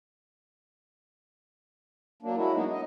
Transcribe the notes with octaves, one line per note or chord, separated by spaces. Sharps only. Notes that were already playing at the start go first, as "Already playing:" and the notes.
F#3 A#3 D4
G#3 E4 F#4
F#3 A#3 B3 D4 D#4
D#5